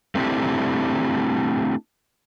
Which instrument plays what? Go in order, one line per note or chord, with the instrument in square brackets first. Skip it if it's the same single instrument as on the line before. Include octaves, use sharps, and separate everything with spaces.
[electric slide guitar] A3 C4 D4 E4 G4